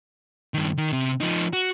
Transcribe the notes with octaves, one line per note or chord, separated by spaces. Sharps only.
G2 D#3
D#3
C3
F3 D#4
F#4